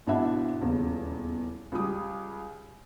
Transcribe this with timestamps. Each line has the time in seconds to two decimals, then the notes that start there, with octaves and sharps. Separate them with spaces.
0.07 G#1 B2 D4 E4 E5 F#5
0.60 D#1 E2 C#3
1.72 C#2 G3 G4 D#6